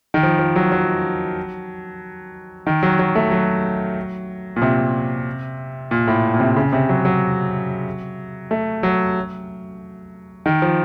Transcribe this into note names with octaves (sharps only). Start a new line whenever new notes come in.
D#3
F3
F3
F#3
F#3
D#3
F#3
F#3
A3
F#3
A#2
C3
A#2
A2
A#2
C3
C#3
C3
F#3
F#3
A3
F#3
D#3
F3